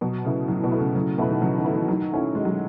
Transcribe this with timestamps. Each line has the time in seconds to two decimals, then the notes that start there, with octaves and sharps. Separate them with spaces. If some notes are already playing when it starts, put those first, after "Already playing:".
0.01 B2 F#3
0.24 C#3 A3 E4 B4
0.48 A2 F#3
0.64 B2
0.71 A3 E4 B4
0.80 C#3
0.95 C#3 F#3
1.18 B2 A3 E4 B4
1.30 D#3
1.42 C#3 F#3
1.57 D#3
1.65 A3 E4 B4
1.72 E3
1.88 D#3 F#3
2.12 A3 C#4 E4
2.35 D#3 G#3
2.45 F#3